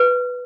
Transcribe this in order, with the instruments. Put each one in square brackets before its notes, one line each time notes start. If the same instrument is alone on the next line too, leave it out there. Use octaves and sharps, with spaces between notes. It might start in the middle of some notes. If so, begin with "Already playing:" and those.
Already playing: [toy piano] B4